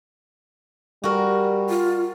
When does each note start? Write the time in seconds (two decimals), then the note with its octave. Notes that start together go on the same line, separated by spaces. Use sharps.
1.04 G3 F#4 A#4
1.69 F4